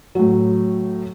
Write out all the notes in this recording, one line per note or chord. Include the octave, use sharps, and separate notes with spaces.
A2 F#3